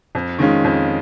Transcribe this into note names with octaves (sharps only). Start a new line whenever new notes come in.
F2
D#3 G#3 C#4 F4
F2